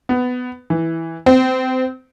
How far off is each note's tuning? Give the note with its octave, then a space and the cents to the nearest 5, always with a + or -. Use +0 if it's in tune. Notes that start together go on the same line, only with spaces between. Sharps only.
B3 +15
E3 -5
C4 -25